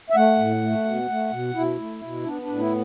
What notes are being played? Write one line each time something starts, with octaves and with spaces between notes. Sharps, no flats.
E5
A3 F#5
A2
A3
B2
A3
B2
B2 E4
A3
B2
B3 D4
D4
A2
E4